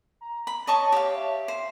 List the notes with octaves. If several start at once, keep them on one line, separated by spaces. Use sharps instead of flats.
A#5
B5
C#5 D#5 A5 C#6
G4 F5
E5
C5